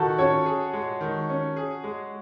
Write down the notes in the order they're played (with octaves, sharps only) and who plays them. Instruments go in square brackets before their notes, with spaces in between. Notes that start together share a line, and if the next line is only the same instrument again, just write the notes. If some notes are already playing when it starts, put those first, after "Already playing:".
Already playing: [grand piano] D#3 [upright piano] F#4 A4
[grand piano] C#4 [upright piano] A4 C#5
[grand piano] G#4
G#3
D#3
C#4
G#4
G#3